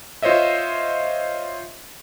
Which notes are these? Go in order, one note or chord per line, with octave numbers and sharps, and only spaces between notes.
F4 C5 C#5 D#5 E5